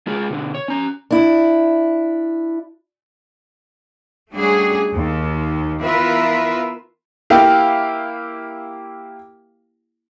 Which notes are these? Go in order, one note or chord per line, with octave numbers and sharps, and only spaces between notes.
G#3 F4 G#4
B2 D3
C#5
C#4 A#5
D4 E4
G3 A3 C#4 D4 F#4 G#4
D#2
E3 B3 F4 A#4 B4 E5
A#3 E4 G4 F5